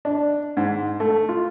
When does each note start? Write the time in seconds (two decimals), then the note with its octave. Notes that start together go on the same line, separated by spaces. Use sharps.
0.05 D4
0.57 G#2
1.00 A3
1.29 F4